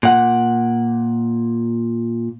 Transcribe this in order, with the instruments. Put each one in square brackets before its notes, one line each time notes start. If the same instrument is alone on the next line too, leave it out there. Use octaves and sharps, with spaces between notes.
[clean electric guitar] A#2 F#5